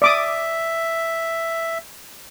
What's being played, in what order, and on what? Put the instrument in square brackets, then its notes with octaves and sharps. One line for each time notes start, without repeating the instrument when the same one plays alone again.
[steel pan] D5 D6 D#6 [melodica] E5